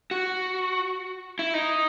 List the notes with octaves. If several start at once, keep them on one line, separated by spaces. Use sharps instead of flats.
F#4
E4
D#4